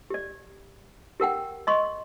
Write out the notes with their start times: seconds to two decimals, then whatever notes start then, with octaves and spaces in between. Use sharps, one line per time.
0.10 G4 D5
1.20 G4 A#4 F#5 G5
1.67 D#5 C6 C#6